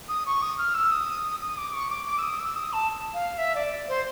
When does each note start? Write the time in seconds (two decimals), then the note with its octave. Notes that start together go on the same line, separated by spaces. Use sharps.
0.09 D#6
0.26 C#6
0.42 D#6
0.58 F6
0.75 E6
0.91 D#6
1.41 D#6
1.57 D6
1.73 C#6
1.90 D6
2.07 D6
2.18 E6
2.23 D#6
2.39 E6
2.56 D#6
2.73 A5
3.14 F5
3.38 E5
3.55 D5
3.88 C5